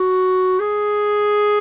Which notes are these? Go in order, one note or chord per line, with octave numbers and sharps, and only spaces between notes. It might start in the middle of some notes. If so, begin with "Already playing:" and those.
Already playing: F#4
G#4